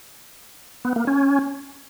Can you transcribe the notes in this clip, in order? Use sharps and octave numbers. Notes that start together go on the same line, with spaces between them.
B3
A#3
C#4